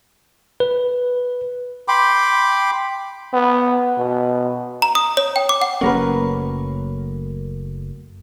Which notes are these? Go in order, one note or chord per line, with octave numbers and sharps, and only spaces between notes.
B4
G5 B5 C6 D6
B3
B2
A#5
D#6
C#5
G5
D6
F#5
F#1 F#3 A3 A#3 C#4 A#4 B4